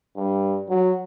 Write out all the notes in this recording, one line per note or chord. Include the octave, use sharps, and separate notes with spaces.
G2
F#3